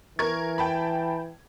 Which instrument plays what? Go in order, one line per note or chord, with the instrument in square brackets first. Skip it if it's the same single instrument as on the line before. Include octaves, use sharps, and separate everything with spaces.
[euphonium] E3 [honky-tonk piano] A#4 C#6 G#6
[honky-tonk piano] G5 A5 B5